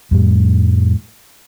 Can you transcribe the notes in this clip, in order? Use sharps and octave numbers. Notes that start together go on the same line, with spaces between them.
F2 A2 G3